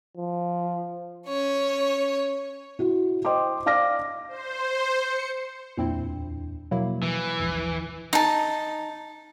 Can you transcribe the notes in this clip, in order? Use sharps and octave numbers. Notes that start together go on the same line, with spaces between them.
F3
C#4 C#5
E4 F#4
C5 D#5 G5 C6 D6
D5 F5 D6 F6 A#6
C5
C#7
D1 E2 A#2 C4 D4 E4
B2 F3 F#3 A#3 E4
E3
D#1 G#1 F3
D#4 A5